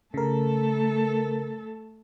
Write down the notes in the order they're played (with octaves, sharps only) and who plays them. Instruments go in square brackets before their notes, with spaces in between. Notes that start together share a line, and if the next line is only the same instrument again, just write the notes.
[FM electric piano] C#3 A#4 [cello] A3 A4